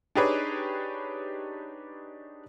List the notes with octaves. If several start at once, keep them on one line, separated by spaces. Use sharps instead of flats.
D4 D#4 G4 G#4 B4 C#5